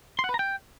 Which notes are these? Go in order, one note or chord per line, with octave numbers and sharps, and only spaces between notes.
C6
F#5
B4
A#5
G5